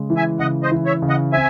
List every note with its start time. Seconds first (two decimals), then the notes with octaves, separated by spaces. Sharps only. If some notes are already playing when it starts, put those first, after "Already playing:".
Already playing: C#3 G#3
0.10 E3
0.17 E5 G#5
0.39 C#3 D#5 F#5
0.63 C5 D#5
0.71 E3
0.86 C#5 E5
1.02 C#3
1.09 D#5 F#5
1.32 C4 E5 G#5